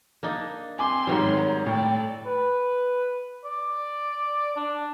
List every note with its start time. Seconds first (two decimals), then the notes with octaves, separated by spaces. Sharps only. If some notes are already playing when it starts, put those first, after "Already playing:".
0.23 A#3 D4 D#4
0.79 C4 G#5 C6 D6
1.07 G#2 D#3 F#3 G3 C#5
1.38 A#5
1.66 A2 A4 D5 G5
2.26 B4
3.45 D5
4.57 D4